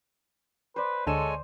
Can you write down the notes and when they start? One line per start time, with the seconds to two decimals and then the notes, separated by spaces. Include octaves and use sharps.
0.76 B4 C5 D5
1.07 D2 D3 G#3 A4 C#5 G#5 E7